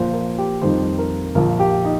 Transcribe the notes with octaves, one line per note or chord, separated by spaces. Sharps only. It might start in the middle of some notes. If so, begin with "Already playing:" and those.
Already playing: A#1 A#2 F3 C5
A#4
G4
F2 D#3 G3 C5
A#4
A#1 A#2 F3 A#4
G4
D#4